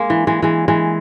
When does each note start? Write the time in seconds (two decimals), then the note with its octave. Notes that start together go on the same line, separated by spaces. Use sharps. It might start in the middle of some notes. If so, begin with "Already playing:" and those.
Already playing: G#3 A#3
0.10 E3
0.27 E3 G#3
0.42 E3 G#3
0.68 E3 G#3